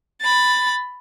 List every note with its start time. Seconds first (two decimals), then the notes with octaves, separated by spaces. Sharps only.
0.21 B5 A6